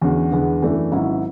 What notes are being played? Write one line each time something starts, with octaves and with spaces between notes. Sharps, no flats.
E2 D3 G#3 C#4 F#4
E2 D3 G#3 B3
F#2 E3 A3 D4
G#1 G#2 F#3 C#4 E4